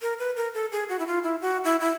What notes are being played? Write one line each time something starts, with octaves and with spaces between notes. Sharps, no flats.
A#4
B4
A#4
A4
G#4
F#4
E4
F4
E4
F#4
E4
E4